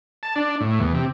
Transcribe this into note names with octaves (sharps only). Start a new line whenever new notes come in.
A5
D4
A2
E2
C3